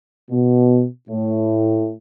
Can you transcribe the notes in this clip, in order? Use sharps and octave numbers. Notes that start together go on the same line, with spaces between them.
B2
A2